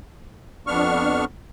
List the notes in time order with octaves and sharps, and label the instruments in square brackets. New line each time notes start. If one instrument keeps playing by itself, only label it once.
[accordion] F2 B3 D4 C#6 F6